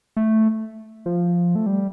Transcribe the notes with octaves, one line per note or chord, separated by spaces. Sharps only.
A3
F3
A3
G3